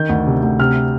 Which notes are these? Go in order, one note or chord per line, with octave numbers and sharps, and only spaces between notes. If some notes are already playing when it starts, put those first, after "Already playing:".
Already playing: D#3 G6
D2
C3
D2
C3 F6